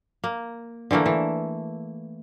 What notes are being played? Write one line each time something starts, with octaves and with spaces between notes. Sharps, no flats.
A#3
D3 E3 A3 A#3
E3